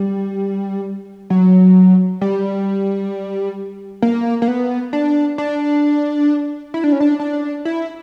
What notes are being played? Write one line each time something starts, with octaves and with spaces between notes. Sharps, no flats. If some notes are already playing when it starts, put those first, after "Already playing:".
Already playing: G3
F#3
G3
A#3
A#3
B3
D4
D4
E4
D4
C#4
D4
D4
E4